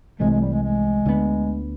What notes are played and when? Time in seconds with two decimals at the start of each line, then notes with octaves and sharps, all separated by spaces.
0.20 C2 C3 E3 G#3 A3
0.31 G#3
0.41 G3
0.52 G#3
0.63 G#3
1.05 D2 D3 F#3 B3